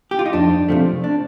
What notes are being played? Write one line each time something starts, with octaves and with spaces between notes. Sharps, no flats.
G4
F4
D#4
F2 D4
C3 F3 A3
D4